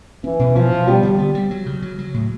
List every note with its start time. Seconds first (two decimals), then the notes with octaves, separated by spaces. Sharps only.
0.24 E3 C#4
0.39 B2
0.55 F3 C#4
0.71 B2
0.87 G3 B3
1.03 D3
1.18 B3
1.35 G3
1.51 F#3
1.66 C#3
1.82 F#3
1.99 F#3
2.14 A2